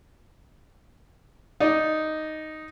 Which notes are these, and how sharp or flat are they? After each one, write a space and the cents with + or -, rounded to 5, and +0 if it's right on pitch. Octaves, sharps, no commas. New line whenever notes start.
D#4 +0 D5 +0